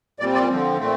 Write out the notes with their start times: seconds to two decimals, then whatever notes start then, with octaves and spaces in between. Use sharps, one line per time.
0.20 A#2 G3 C4 D5
0.34 D5
0.49 D3 F3 C4
0.78 A#2 A3 C4